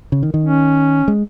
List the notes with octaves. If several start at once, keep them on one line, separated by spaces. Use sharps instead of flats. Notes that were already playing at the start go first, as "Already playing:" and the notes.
C#3
D#3
D#3
C#4
G#3